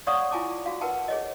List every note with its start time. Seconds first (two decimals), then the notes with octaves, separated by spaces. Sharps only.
0.07 C#5 D5 F5 F#5 C#6 D#6
0.31 E4 F4 G#5 A5 D6
0.66 F#4 F5
0.81 A#4 B4 F#5 G5 A5
1.08 G#4 C#5 D#5